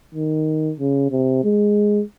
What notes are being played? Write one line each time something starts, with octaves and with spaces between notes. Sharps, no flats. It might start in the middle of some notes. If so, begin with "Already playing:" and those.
D#3
C#3
C3
G#3